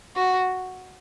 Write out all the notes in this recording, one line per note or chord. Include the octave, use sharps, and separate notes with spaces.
F#4